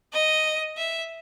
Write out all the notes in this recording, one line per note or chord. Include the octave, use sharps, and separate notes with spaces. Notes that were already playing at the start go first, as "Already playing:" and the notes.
D#5
E5